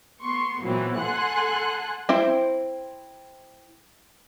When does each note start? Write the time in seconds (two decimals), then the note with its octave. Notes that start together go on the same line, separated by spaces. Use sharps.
0.24 B3 C6 C#6
0.61 A#2 E3 F#3 B3 C4
0.99 A4 F#5 G#5 C6 F#6
2.09 C4 E4 C5